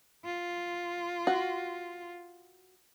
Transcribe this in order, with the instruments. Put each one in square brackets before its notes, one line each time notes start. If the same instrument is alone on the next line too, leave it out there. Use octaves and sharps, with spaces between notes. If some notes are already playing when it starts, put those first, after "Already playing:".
[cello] F4
[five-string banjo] F#4